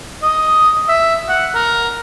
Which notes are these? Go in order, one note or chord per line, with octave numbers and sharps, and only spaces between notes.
D#5
E5
F#5
A#4